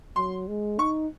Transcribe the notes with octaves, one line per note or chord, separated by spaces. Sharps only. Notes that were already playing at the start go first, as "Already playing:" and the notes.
F#3 C6
G#3
D#4 C#6